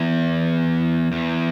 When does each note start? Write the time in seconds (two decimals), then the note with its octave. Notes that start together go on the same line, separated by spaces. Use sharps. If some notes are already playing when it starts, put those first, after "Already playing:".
Already playing: E2
1.12 E2